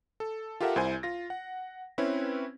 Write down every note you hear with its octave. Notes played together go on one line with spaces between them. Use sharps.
A4
F4 G4 A4 A#4 E5 F#5
C2 E4 C5 G#5
F4 A#6
F#5
C4 C#4 E4 B4